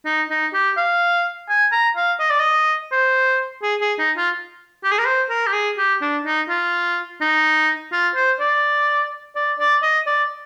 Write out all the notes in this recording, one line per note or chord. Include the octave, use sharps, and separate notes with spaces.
D#4
D#4
G4
F5
G#5
A#5
F5
D#5
D5
D#5
C5
G#4
G#4
D#4
F4
G4
G#4
A#4
C5
A#4
G4
G#4
G4
D4
D#4
F4
D#4
F4
C5
D5
D5
D5
D#5
D5